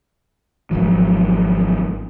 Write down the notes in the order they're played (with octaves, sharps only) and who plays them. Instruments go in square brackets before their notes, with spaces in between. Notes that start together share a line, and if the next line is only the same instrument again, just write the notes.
[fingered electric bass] G#1 F3 F#3